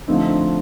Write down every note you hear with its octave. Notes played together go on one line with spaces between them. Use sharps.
D3 F3 A3 C4 D#4